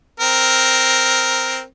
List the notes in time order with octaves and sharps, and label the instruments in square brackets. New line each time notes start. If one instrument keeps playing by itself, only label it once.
[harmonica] C4 A#4